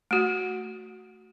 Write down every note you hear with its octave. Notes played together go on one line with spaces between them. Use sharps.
A3 F#4